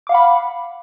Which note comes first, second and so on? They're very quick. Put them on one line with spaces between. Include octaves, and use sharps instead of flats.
D6 F5 F#5 B5